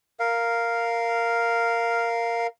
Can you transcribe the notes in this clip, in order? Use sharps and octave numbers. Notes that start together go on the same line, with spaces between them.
A#4 F5